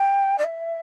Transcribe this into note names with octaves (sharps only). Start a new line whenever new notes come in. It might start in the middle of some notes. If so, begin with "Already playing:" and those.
Already playing: G5
D5
E5